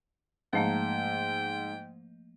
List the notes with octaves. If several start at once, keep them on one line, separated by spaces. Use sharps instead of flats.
G#2 F3 A3 A#3 G5